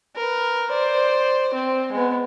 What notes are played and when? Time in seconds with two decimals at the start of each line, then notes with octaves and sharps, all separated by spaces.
0.16 A#4 B4
0.70 C5 D5
1.54 C4
1.92 G#3 B3